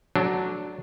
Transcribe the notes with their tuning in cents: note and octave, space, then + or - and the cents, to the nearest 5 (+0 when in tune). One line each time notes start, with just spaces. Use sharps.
F#3 +0 A3 -25 D4 +0